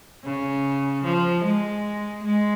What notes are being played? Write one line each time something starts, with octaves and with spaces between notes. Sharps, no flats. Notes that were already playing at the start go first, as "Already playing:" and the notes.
C#3
F3
G#3
G#3